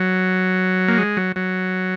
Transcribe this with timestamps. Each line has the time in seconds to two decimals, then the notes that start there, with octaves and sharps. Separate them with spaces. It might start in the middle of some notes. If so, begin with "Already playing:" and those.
Already playing: F#3
0.88 A#3
0.98 G#3
1.17 F#3
1.36 F#3